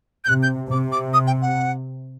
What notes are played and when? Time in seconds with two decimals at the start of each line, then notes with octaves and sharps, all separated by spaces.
0.24 G6
0.28 C3 F#6
0.43 G6
0.70 C3 D6
0.92 D6
1.13 D#6
1.27 G5
1.41 F#5